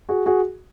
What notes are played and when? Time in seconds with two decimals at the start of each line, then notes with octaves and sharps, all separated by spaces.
0.09 F#4 G#4
0.26 F#4 G#4